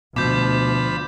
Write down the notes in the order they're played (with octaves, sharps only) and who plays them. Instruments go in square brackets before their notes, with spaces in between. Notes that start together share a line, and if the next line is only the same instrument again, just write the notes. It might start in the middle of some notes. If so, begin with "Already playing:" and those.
[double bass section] D2 [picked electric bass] B2 [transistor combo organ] F3 B5 [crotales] D6 G6